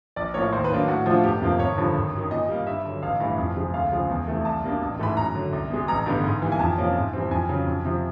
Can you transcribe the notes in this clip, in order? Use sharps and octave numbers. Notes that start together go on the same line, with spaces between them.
A#1 D5
A2 F3 A#3 C#5
D#2 C5
B4
D#3 F#3 A#3 D4
A2 F#4
F3 A3 D4 F4
G1 G4
F2 C3 F3 A#3
G#1 C#5
G2 D3 F3
G#1
F#2 D#3
A#2 D#5
G3 A#3
G2 E5
D3 F#3
A1 F5
G2 E3 A3
F2
C3 F3 G#3
D2 F5
C#3 F3 G#3
E2
C3 E3 A3
C2 A5
B2 G3 A#3 D4
A1
G#2 E3 A3 B5
F#2 A#5
D3 F#3
C2
B2 G#3
A1 A#5
G2 D3 G3 B3
G#2
E3 G3 A#3
G#5
F2 A5
C3 F3 A#3 C#4
G#2
E3 G3 C4
F2 G#5
C#3 F#3
F2
C3 F3